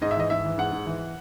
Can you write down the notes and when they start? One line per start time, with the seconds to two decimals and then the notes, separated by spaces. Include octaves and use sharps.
0.01 G#2 D#5
0.11 E5
0.17 E3 D#5
0.30 G#2 E5
0.45 E3
0.58 G#2 F#5
0.72 G#2
0.86 E3